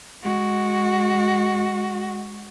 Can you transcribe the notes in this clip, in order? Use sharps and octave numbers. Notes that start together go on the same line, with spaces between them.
G#3 F#4